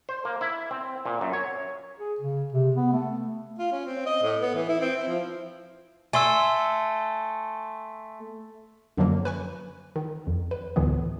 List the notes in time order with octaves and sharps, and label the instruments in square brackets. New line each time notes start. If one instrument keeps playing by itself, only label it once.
[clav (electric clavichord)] C5
A#3
E4
C4
A#2
F#2
C#5
[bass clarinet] G#4
C#3
C3
B3
A3
[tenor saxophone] F4
C#4
C4
D#5
A2
B3
E3
E4
C4
E4
F3
[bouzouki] A3 [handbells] G#5 C6 E6
[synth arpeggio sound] F#2 D3 F3 F#3 A#3
B4 G#5 C#6
D#3
F2
B4
D2 A2 D3 E3 F#3 B3